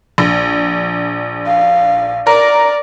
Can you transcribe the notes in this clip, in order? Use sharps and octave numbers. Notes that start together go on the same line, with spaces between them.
A#1
F5
A#4 D5